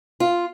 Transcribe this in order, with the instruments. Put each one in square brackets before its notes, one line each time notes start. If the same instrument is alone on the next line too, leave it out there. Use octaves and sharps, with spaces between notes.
[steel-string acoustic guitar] F4